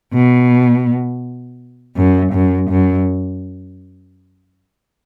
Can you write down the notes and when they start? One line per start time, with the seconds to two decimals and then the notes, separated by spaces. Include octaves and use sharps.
0.13 B2
1.97 F#2
2.33 F#2
2.70 F#2